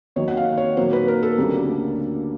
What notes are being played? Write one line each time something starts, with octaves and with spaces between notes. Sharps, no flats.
D#2 D#3 F#3 C#5
F#5
F5
C#5
A#2 F#3 A#3 D#4 C5
B4
A#4
A4
D2 C#3 F#3 A#3 D4 G4